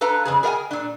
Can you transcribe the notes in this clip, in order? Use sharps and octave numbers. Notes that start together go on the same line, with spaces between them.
D4 A4 B4 F5 A#5
F2 C#3 G#4
G#4 A#4 D5 F5 G5 G#5
A#2 D4